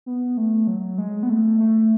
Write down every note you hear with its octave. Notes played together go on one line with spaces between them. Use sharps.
B3
A3
F#3
G#3
B3
A3
A3